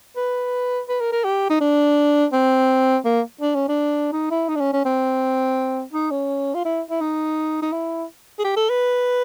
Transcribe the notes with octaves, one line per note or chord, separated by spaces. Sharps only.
B4
B4
A#4
A#4
G4
D#4
D4
C4
A#3
D4
C#4
D4
D#4
E4
D#4
D4
C#4
C#4
C4
D#4
C#4
F4
E4
E4
D#4
D#4
E4
G#4
G4
A4
B4